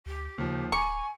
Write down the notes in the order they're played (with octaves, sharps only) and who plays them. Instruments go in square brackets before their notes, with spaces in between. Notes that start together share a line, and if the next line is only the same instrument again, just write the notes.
[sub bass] D2 [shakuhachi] G4
[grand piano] D#2 F3 [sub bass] C#3
[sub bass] D1 [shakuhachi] G#5 [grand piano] A#5 D6 C#7 [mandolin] C#6